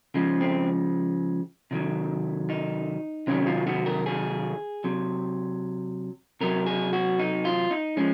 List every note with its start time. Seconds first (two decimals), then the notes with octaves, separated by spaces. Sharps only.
0.14 C#3 F3 G#3
0.41 C4
1.71 C3 D#3 F#3
2.50 D#4
3.27 C3 D#3 F#3 C#4
3.47 F4
3.67 F#4
3.86 A#4
4.06 G#4
4.84 C3 F#3
6.41 C3 F#3 A#4
6.66 G#4
6.93 F#4
7.19 D#4
7.45 F4
7.71 D#4
7.97 F3 G#3 C#4